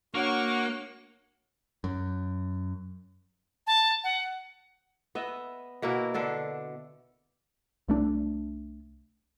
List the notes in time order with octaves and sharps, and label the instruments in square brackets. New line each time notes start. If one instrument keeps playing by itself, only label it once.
[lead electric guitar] A#3 [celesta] D4 C#5 F#5 [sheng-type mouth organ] F#4 C#6
[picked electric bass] F#2
[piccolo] A5
F#5
[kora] B3 D#5 E5
B2 A#3 E4 F#4
D3 D4 A4 D5
[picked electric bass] C2 A3 D4